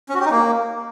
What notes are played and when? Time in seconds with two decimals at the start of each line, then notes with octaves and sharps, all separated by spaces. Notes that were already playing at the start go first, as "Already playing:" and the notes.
0.09 C#4
0.14 F#4
0.20 G4
0.25 D#4
0.31 A#3